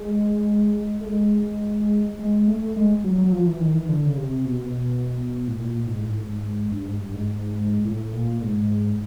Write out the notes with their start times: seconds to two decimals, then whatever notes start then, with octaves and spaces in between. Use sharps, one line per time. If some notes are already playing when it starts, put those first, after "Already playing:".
Already playing: G#3
1.01 A3
1.06 G#3
2.19 G#3
2.48 A3
2.76 G#3
3.04 F#3
3.18 F#3
3.32 F3
3.47 E3
3.60 D#3
3.74 E3
3.89 D3
4.06 C#3
4.17 C3
4.45 B2
5.48 A2
5.59 A#2
5.87 G#2
6.00 A2
6.13 G#2
6.72 G2
6.86 G#2
7.00 G2
7.14 G#2
7.85 A2
8.13 A#2
8.42 G#2